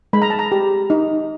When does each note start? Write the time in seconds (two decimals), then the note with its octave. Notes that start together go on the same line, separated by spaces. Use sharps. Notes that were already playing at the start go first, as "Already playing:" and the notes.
0.13 G#3 B5
0.22 A#5
0.30 A5
0.39 A#5
0.52 G4
0.90 D#4